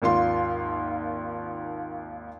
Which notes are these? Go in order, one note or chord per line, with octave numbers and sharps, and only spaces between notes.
G#1 D#2 F4 C6